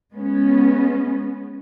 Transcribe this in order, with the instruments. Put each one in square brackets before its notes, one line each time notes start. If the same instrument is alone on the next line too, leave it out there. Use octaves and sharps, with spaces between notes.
[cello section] G#3 B3 C#4